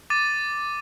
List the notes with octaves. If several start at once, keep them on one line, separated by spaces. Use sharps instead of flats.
D6 A6 D#7